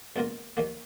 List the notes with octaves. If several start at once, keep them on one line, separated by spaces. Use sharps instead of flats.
C#2 B2 A#3 F4 A#4
D#2 D#3 A#3